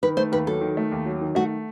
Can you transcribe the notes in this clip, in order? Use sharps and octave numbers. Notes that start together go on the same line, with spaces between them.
D#3 B4
A3 C5
D#2 B4
F#3 A4
D#3
A3
D#2
F#3
D#3
A3 F#4